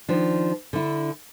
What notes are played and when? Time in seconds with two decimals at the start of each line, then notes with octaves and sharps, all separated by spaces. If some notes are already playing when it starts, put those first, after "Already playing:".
0.09 D#3 F3 D4
0.73 D3 E4